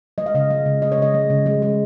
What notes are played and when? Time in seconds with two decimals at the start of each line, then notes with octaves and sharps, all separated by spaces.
0.18 G#3 D#5
0.26 F5
0.34 C#3 D#5
0.50 G#3 F5
0.66 C#3
0.82 G#3 D#5
0.92 C#5
0.98 C#3 D#5
1.14 G#3
1.30 C#3
1.46 G#3
1.62 G#3